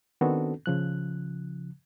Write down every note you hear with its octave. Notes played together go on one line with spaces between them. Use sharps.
D#3 B3 C4 D4 F#4 A4
C#3 F3 F#6